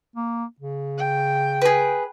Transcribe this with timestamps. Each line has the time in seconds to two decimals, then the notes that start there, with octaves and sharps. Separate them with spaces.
0.16 A#3
0.60 C#3
0.98 G5
1.62 G#4 B4